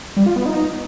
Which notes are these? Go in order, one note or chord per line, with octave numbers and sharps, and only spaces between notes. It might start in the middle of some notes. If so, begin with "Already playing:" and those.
G3
F4
B3
D#4